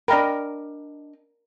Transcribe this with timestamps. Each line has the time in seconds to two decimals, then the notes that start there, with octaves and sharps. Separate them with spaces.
0.08 D4 A#4 D5 D#5 G5 A#5 B5